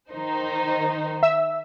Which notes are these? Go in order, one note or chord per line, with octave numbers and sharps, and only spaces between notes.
D#3 D#4 C5
E5 E6